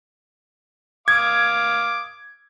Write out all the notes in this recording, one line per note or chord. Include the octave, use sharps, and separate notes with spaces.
F5 D6 D#6 G#6